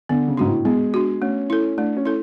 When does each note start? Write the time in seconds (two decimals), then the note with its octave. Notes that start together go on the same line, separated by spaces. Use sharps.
0.09 D3 B3
0.28 C#3
0.37 G#2 D4 F#4
0.46 A2
0.65 G#3 B3
0.94 D4 F#4
1.22 A3 C#4
1.50 E4 A4
1.77 A3 D4
1.97 C#4
2.05 E4 A4